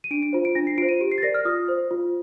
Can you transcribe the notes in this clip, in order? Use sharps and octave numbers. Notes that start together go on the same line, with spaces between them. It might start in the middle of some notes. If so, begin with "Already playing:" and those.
D#7
D4 D7
D7
F4 C5
D7
D4 A#6
C7
F4 C5 D7
D#7
G4 D7
C7
A6
A#4 D5 A#6
F6
F4 D#6
C5
F4